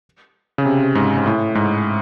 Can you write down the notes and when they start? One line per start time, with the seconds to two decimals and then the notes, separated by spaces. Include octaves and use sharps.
0.58 C#3
0.65 C3
0.95 G#2
1.17 G#2
1.26 A2
1.55 G#2